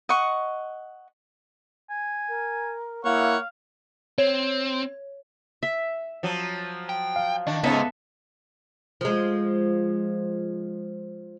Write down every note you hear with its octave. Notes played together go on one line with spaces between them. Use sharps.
D#5 F#5 C#6
G#5
A#4
A#3 E4 C#5 F5 F#5 C#6
C4 C#5
E5
F3 F#3
G5
F5
D#3 D4
C#2 G#2 B3 C#4 D#4 A4 E5
F3 G#3